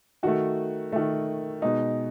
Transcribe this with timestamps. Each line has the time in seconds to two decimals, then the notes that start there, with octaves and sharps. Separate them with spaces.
0.23 D#3 A3 F#4
0.92 D#3 A3
1.62 B2 G#3 D#4